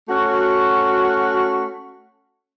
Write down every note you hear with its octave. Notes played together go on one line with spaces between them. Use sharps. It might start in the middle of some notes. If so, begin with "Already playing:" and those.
A3 C#4 F#4